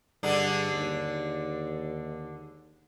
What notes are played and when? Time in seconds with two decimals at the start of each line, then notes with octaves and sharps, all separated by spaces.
0.23 G2 D3 G#3 D4
0.74 D#2